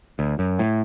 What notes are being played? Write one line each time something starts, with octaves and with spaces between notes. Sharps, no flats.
D2
F#2
A2